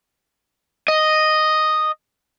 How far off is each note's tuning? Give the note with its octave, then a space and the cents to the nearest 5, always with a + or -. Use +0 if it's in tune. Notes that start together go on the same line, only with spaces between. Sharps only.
D#5 -5